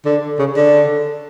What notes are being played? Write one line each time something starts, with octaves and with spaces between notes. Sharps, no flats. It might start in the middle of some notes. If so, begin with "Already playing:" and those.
D3
C#3
D3